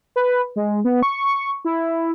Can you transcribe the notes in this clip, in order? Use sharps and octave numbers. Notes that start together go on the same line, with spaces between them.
B4
G#3
B3
C#6
E4